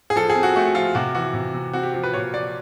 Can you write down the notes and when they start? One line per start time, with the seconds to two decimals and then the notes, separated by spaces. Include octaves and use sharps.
0.10 G#4
0.16 F3 A4
0.30 G#4
0.35 C4
0.43 F#4
0.56 A3 F#4
0.75 F3 F4
0.95 C3 F#4
1.15 E3 F#4
1.34 C3
1.55 C3
1.73 C4 F#4
1.83 G4
1.94 F3
2.04 B4
2.13 A#2 C#5
2.34 F3 D5